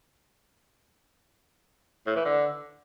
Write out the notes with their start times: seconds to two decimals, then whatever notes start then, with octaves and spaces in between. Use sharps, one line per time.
2.07 A2
2.16 E3
2.25 D3